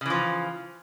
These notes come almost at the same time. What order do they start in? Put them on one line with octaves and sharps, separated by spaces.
C#3 E3 F3